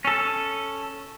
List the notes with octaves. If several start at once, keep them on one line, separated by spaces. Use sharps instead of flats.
C#4 A4